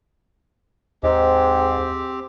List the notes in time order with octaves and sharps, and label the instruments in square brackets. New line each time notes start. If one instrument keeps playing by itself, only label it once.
[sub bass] D#2 [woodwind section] G#2 [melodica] C4 G4